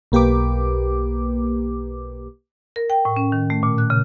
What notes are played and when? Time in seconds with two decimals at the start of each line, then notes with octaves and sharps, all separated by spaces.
0.12 B1 A#3 G4 B4 D6
2.76 A#4
2.90 G5
3.05 A2
3.16 C#4
3.32 D#3
3.50 A3
3.63 A#2
3.78 F#6
3.90 C#3